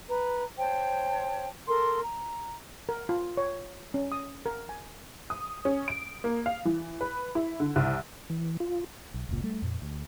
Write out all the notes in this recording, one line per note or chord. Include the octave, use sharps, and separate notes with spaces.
B4 A#5
C5 C#5 G5 A5
A4 A#4 C6
A#5
A#4
F4
C#5
C#4
D#6
A#4
G#5
D#6
C#4
D7
A#3
F5
E3
B4
E4
D3
C2
E3
F4
B1
F1 C#2 A#2
G3 A3
F2 A#2
D2